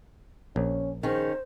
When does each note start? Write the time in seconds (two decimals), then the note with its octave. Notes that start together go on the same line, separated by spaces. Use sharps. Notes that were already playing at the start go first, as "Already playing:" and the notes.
0.56 A#1 C#4
1.03 D#3 C#4 G#4 C5